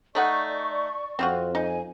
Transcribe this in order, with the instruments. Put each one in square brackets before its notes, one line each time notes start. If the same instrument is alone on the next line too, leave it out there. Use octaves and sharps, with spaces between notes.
[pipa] A3 D#4 F#5 [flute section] D5 C#6
[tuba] F2 [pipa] C4 F4 F#4
[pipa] D#4 [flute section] G#5